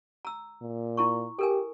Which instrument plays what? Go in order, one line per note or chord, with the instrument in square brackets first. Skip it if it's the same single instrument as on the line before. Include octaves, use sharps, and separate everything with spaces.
[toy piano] A#5 E6
[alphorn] A#2
[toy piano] E4 A#5 C#6
[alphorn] G4 [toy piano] A4 A#4 G#5